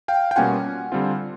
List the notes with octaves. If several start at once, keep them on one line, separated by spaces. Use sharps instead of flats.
F5 G5
G5
B2 G3 A#3 C#4 F4 F#5 G#5
D3 G3 C4 F4